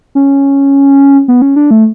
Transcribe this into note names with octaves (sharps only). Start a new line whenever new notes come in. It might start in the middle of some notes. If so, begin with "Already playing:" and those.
C#4
B3
C#4
D4
A3